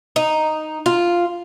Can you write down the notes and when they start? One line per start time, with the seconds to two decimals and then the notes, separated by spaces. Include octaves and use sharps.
0.16 D#4
0.86 F4